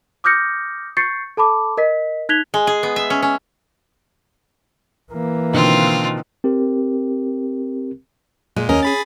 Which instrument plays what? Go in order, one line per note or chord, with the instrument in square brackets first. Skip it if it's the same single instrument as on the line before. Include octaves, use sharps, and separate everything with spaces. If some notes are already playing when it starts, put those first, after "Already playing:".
[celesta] D6 D#6 F6 G6 A#6 C#7
C#6 G6 A6 C7 C#7
A4 A5 B5 D6
A#4 D#5 B6
D#4 F#6 G#6 B6 F7 G7
[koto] G#3
G#4
B3
E5
C#4
C#4
[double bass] E3 A#3
[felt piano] B2 D3 D#3 [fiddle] C4 F4
[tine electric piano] C4 G4 A#4
[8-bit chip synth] A#2 [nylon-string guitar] G#3
[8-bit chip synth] D#2 A#4 D#5 [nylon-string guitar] C#4
[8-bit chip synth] G#4 B5 A6